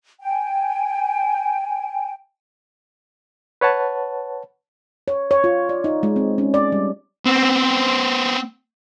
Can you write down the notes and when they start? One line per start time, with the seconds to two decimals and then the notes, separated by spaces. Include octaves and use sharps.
0.22 G5 G#5
3.61 B4 C#5 F#5 A5
5.08 C#5
5.31 C#5
5.44 F4
5.69 D5
5.84 D#4
6.03 G#3
6.16 C4
6.38 C#4
6.54 D5
6.72 G3
7.25 B3 C4